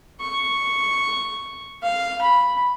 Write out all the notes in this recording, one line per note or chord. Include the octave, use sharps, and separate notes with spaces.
C#6
F5
B5